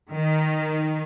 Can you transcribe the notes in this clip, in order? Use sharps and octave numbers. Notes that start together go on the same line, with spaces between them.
D#3